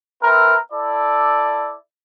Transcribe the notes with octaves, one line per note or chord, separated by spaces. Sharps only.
C4 A#4 B4 E5
E4 A4 D5